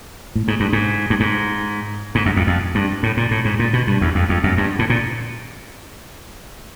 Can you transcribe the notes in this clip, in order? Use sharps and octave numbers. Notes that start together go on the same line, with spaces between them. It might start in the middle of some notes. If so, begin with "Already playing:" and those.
A2
G#2
G2
G#2
G2
G#2
G#2
F#2
F2
F2
G2
A2
A#2
A2
G#2
A#2
B2
G2
E2
F2
F2
F#2
G2
A2
A#2